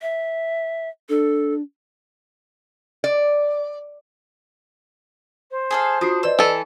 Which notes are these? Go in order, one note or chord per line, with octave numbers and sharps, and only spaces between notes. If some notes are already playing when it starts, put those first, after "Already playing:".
E5
D4 A4
D5
C5
G#4 A4 F5
D4 F4 F#4 D#6 C7
B4 D5 D#5 E6
E3 A4